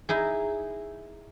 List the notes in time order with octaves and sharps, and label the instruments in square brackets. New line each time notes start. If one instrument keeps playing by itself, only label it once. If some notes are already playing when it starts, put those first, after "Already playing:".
[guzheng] D#4 E4 G#4